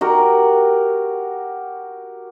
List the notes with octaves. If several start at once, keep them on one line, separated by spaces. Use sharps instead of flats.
F#4 G4 A#4